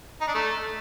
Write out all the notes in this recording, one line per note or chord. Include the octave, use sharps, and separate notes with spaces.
D#4
D4
A3